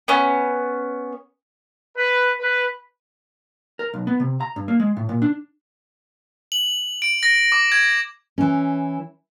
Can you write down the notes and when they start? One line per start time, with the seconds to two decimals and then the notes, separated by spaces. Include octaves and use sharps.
0.08 B3 C#4
1.95 B4
2.39 B4
3.79 A#4
3.94 B1
4.07 B3
4.20 C3
4.41 A#5
4.56 G2
4.68 A#3
4.80 G#3
4.97 A2
5.09 A#2
5.22 D4
6.52 F#7
7.02 D7
7.23 A#6
7.52 D6
7.72 G#6
8.38 E3 C#4